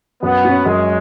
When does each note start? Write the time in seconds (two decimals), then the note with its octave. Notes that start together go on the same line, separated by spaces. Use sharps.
0.23 F#2 B3
0.45 F#3 C#4
0.66 F#2 G#3